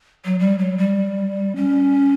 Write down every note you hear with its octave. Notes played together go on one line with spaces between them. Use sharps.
F#3
G3
F#3
G3
C#4